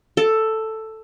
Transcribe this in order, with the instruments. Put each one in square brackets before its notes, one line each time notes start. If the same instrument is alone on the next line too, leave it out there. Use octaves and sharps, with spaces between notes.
[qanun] A4